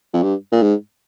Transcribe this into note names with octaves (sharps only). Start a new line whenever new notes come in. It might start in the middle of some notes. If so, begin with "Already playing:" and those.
F2
G2
A#2
G#2